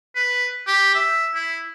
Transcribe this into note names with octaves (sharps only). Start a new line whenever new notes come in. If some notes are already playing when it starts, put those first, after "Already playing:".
B4
G4
E5
E4